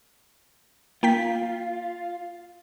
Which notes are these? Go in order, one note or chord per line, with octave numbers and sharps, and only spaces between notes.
A#3 F4 G5 B6